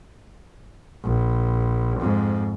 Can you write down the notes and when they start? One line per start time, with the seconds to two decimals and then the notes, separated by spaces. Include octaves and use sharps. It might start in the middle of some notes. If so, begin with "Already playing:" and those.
1.04 A#1
1.99 F2 G#2